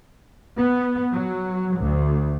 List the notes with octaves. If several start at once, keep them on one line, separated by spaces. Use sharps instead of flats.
B3
F#3
D2